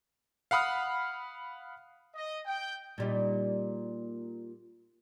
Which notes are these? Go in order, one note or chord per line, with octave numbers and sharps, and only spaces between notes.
F5 F#5 B5 D#6 F6
D#5
G5
A#2 G3 D#4